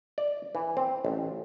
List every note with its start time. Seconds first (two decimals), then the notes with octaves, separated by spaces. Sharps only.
0.18 D5
0.55 E3
0.77 C4
1.05 A1